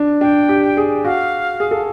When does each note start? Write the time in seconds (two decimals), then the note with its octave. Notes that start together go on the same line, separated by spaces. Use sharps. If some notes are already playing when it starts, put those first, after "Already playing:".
Already playing: D4
0.21 D4 G5
0.49 G4
0.77 G#4
1.05 F#4 F5
1.60 G#4
1.71 A4